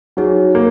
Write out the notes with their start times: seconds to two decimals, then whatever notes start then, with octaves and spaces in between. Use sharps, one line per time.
0.17 F#3 D#4 G#4 C#5
0.55 A#3